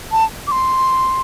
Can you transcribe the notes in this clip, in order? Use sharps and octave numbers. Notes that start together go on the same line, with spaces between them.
A5
D6
C6